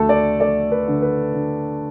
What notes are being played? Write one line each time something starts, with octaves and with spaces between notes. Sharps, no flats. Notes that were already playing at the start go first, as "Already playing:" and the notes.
Already playing: D2 A3 F#4 A4
D5
A3 D5
B4
D3
B4
D3